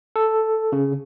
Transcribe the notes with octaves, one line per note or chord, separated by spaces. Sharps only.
A4
C#3